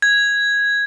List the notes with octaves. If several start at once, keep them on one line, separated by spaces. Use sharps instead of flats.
G#6